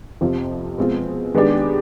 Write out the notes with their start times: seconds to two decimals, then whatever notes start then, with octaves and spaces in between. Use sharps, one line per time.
0.21 F2 C3 F3 C4 F4
0.78 B2 G#3 C4 F4
1.34 D#3 G#3 B3 D4 G4